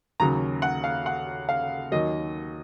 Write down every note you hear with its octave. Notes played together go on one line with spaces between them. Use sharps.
D#2 C#3 F#3 A#5
F#5
F5
F#5
F5
D#2 D#3 F#3 D#5